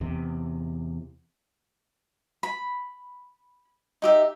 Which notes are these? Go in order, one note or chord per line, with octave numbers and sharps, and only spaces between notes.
E2 C3
B5
D#4 G4 E5